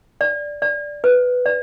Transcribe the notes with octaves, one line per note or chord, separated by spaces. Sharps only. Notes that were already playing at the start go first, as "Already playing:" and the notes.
D5
D5
B4
D5